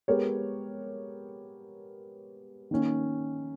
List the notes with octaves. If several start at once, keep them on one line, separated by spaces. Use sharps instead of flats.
G#3 B3 G4 A#4 C#5
D#3 A#3 C#4